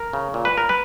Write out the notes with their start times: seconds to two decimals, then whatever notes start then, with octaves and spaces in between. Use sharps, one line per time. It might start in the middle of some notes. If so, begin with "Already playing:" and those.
Already playing: A#4
0.13 C#3
0.34 A#2
0.45 B4
0.53 A#2 A#4
0.69 B4